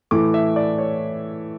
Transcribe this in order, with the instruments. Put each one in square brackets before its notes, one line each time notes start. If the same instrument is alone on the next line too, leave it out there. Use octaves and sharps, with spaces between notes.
[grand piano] A2 E3 A3 D6
E5
D5
C#5